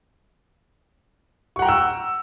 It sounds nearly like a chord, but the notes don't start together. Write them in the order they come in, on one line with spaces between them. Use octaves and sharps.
C#6 F#5 A#5 G5 E6